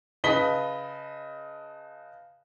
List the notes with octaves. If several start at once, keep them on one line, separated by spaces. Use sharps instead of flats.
C#3 B4 D#5 A5 B6 G7